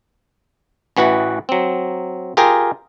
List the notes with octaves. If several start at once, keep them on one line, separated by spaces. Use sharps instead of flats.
A1 E3 F#4 B4 F#5
F#3 C4
F4 G4 G#4 A#4 G5